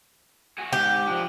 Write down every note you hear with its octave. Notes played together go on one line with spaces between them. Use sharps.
F#4 G#4
G#2 G4
F3 D4